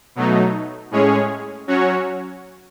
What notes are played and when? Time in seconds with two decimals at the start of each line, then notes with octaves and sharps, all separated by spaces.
0.16 B2 F#3 A3 D#4
0.91 A2 G#3 C#4 G#4 C#5
1.67 F#3 C#4 F#4 C#5